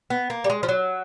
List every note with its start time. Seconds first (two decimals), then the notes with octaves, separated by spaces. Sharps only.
0.10 B3
0.30 A#3
0.44 G3
0.50 G#3
0.63 F3
0.69 F#3